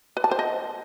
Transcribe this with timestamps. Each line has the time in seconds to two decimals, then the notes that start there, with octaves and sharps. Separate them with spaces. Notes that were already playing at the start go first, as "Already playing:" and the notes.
0.17 B4
0.24 A5
0.31 C5
0.39 D#5